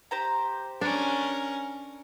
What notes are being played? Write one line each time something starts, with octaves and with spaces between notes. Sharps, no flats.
G4 C5 A#5
C#4 D4 A#4